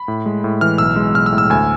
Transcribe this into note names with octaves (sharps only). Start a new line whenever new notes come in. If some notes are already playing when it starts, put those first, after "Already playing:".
Already playing: B5
A2
G#3
A2
E3 F6
B1 E6
G#3
B1 F6
E6
A2
E6
D2 G#5